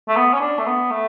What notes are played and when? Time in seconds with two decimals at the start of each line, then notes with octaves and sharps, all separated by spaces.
0.08 A3
0.16 B3
0.33 C#4
0.41 D4
0.59 A3
0.66 B3
0.91 A3